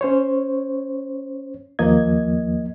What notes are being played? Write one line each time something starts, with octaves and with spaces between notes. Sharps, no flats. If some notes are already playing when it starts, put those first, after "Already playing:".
C#4 C5 C#5
D#2 F3 A#3 D#5 G#6